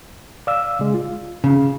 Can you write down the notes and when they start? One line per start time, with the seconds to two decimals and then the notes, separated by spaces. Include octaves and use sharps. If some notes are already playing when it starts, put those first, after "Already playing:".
0.47 D5 F5 E6
0.79 C#3 G#3
0.94 F4
1.44 C#3